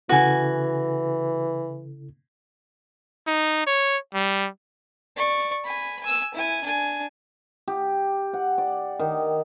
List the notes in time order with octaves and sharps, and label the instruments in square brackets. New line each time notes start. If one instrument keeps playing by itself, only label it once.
[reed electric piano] C#3 E4 A4 [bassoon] E3 [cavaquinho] F#4 G#5
[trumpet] D#4
C#5
G3
[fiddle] D5 C#6
G#5 B5
G#5 E6
E4 G#5
D4 G#5
[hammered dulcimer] G4
F#5
D5
D#3